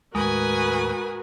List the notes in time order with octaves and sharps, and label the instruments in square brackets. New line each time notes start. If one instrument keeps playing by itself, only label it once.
[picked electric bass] D#2 A2 [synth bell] G#3 [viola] F#4 A#4 [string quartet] B4 G#5 D#6